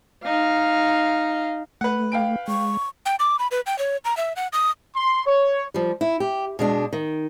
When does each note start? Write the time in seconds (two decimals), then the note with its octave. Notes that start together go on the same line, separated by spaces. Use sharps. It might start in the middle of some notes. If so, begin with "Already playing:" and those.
0.24 D#4 F5
1.81 A3 B4 F#5
2.12 F5 G5 D7
2.48 G#3 C#6
3.06 G5
3.20 D6
3.39 B5
3.51 B4
3.66 G5
3.79 C#5
4.05 A#5
4.17 E5
4.36 F#5
4.53 D#6
4.95 C6
5.25 C#5
5.74 F3 G3
6.01 E4
6.20 G4
6.59 B2 G#3 D4
6.93 D#3